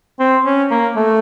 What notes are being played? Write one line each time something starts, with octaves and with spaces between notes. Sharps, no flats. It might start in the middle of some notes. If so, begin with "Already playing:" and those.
C4
C#4
A#3
A3